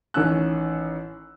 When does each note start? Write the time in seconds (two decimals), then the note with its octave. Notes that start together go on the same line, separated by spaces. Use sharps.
0.14 A1 D#3 C#4 E6 F#6